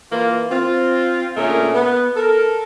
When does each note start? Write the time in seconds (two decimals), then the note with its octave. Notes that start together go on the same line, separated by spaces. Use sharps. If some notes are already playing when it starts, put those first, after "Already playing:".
0.11 E3 A#3 F4
0.51 C4 F4
1.36 A#2 D3 A3 C#4 G#4 A#4
1.74 B3
2.16 A4 A#4